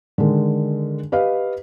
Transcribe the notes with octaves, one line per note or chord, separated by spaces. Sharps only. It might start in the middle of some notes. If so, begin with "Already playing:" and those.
D3 D#3 G#3
G4 B4 D#5 F5